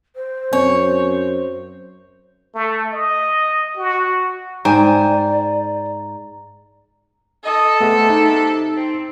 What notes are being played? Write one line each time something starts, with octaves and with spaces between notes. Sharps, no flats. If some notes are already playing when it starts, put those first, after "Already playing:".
C5
F#2 C4 C#5
A3
D#5
F#4
G#2 C5 D5 G5 G#5 A#5
A4 D#5
C3 A3 B3 G#4
D#4
C4